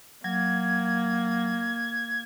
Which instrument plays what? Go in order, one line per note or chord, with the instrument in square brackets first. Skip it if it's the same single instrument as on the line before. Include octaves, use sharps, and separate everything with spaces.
[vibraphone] F#3 [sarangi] A#3 [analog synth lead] G#6